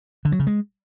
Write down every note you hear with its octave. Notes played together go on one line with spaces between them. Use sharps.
D3
F#3
C#3
G#3